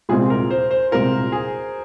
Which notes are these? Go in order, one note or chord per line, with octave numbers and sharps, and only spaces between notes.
C2 A#2 G#3 C4 F4 G#4
A#4
C5
C5
C2 A#2 G#3 C4 F4 A#4
G#4